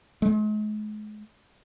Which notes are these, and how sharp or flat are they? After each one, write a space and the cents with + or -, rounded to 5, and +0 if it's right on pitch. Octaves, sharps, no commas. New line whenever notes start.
G#3 +40